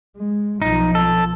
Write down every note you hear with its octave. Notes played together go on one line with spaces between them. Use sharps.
G#3
B1 F3 D#4
A4